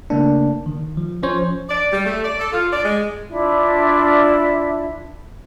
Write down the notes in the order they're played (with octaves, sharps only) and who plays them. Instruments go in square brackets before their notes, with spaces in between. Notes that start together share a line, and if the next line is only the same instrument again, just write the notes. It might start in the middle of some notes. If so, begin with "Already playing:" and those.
[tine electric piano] C#3 A3 A#3 D4
D#3
F3
F3 C#4 C5 C#5
[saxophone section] D5
G3
A3
D5
A4
F4
D5
G#3
[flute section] D4 E4 F4 E5